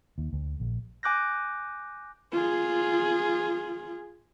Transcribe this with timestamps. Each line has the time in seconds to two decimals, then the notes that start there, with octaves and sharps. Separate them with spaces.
0.18 D#2
0.33 D2
0.60 A#1
1.03 G#5 D6 F#6 G6 A#6
2.32 F4 G#4